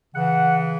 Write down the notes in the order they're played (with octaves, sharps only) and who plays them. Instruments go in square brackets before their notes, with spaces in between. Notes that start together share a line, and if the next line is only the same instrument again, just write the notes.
[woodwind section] C#3 E3 F#5